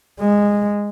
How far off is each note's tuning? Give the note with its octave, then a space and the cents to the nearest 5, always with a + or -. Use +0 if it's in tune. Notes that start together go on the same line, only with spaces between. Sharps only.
G#3 -15